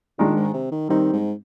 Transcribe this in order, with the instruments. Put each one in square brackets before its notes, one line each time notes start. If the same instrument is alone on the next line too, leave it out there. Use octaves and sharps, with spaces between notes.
[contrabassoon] A#2 [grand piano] D#3 G#3 D4
[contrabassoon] G#2
C3
D#3
[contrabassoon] D#3 [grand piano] G3 C4 D#4
[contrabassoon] G#2